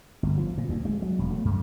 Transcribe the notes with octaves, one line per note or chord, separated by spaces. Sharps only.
G1
F3
A#2
D2
G#3
F#3
E1
A3
F#2